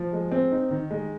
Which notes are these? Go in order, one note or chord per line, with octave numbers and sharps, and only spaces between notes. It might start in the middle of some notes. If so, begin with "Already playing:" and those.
Already playing: F3
G#3
C4
D#4
D#3
G#3